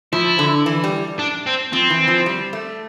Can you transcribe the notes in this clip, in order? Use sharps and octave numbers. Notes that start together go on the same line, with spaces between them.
F3 E4
D3
E3
G3
D4
C4
F3 C4
E3
F3
G3
A3